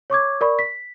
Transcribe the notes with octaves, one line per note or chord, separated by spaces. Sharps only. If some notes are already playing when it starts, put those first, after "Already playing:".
C#5 C#6 D6 G#6
A#4 D5 B5 C#6
B6